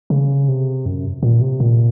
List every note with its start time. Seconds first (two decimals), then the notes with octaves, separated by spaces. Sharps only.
0.10 C#3
0.48 C3
0.86 F#2
1.23 A#2
1.41 C3
1.60 A#2